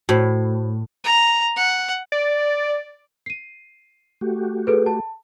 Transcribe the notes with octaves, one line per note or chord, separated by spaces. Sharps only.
A2 F#4 C5
A#5
F#5
D5
C7 D#7
A3 F#4 G4
G#4 A4 B4
A5